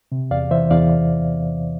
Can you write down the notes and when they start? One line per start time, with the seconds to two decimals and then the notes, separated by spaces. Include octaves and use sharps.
0.12 C3
0.31 E2 D5 F5
0.51 E3 C5 E5
0.71 E2 D5 F5